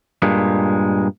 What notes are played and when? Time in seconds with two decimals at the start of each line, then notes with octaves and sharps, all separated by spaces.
0.22 G2 A#2 G#3